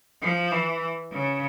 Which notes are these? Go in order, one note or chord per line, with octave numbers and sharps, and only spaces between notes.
F3
E3
C#3